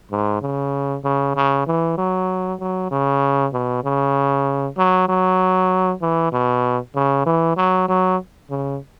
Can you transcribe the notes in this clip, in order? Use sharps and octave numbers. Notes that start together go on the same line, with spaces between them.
G#2
C#3
C#3
C#3
E3
F#3
F#3
C#3
B2
C#3
F#3
F#3
E3
B2
C#3
E3
F#3
F#3
C#3